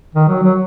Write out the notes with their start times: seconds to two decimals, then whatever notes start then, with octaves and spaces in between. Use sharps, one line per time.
0.15 D#3
0.28 F#3
0.43 F#3